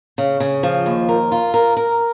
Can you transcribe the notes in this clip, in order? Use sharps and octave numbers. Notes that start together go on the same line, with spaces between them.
C#3
C#3
F3
D#2
A#4
F4
A#4
A#4